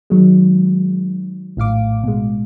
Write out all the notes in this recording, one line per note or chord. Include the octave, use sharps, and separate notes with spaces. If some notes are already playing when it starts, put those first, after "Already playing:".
D#3 F#3 G#3
A#1 A2 F5 D6
B2 G#3